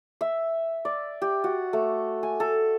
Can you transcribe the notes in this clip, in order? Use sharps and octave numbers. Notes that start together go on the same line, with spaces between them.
E5
D5
G4
F#4
A3
G#5
A4